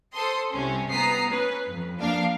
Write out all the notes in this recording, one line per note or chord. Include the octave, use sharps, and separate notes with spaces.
A4 C5 C6 D#6
C2 C3 C#4
B3 A#5 D#6 B6 C7
C#4 B4
F2
F3 A#3 D4 F5